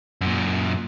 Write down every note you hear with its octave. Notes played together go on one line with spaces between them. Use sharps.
F#2 A#2